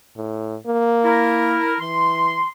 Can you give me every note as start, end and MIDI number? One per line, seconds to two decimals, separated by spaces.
0.17 0.56 45
0.66 1.58 58
1.04 1.75 64
1.04 1.75 70
1.80 2.43 52
1.80 2.48 84